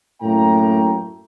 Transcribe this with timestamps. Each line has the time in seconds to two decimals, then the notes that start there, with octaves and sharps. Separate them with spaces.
0.21 F#2 A2 A3 A#3 G5 A#5